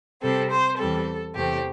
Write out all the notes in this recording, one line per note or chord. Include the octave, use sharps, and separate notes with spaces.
C3 G3 C4 A4
C5
E2 E3 G3 C4 A4
E2 C3 A3 C4 G4